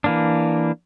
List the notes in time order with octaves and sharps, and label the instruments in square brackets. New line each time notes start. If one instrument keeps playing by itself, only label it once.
[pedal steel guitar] E3 A#3 D4